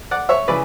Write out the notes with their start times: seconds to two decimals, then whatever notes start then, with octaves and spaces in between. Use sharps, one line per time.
0.11 D5 F#5
0.29 C#5 E5
0.48 C#3 E3 B4 D5